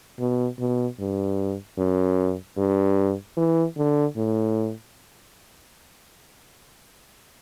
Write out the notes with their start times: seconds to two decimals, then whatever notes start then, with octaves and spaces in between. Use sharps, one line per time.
0.19 B2
0.59 B2
0.99 G2
1.78 F#2
2.57 G2
3.37 E3
3.77 D3
4.16 A2